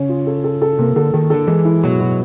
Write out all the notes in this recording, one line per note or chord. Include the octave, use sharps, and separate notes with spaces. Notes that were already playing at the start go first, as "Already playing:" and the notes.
Already playing: C#3 C#4
F4
A4
A4
A4
C3 A#3
D3 A4
D#3 A4
D3 A4
E3 G#3
E4
B2 F#3
B2